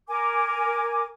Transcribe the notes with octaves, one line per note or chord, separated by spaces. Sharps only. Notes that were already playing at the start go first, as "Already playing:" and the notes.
A#4 G#5 D6